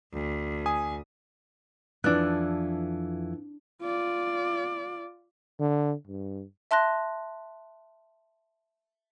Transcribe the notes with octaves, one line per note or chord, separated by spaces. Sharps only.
D2
G#5 D#6
F2 E3 D4 F#6
F4 D5
D3
G2
E5 A5 C6 F#6 A#6